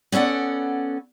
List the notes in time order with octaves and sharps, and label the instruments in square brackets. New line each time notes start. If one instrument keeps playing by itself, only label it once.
[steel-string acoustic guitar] B3 C#4 A4 D5 F#5